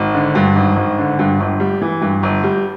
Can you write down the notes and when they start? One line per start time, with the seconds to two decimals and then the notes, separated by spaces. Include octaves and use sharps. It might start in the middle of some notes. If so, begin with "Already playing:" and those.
Already playing: G#1
0.14 D3
0.35 G2
0.56 G#1
0.76 G#1
0.98 D3
1.19 G2
1.40 G1
1.60 G3
1.82 E3
2.02 G2
2.23 G1
2.43 G3